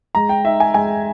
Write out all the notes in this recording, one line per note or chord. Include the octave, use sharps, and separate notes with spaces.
G#3 A#5
G5
D#4 E5
G#5
G#3 G#5